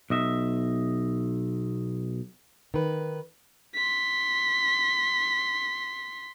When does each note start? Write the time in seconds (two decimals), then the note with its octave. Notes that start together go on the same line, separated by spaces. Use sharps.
0.10 B1 D#5 E5
2.74 D#3 B4
3.75 C6 B6